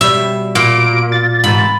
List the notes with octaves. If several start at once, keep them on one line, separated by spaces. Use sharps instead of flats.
B2 G3 E5
A#2 D7
A6
G#2 C3 E3 B5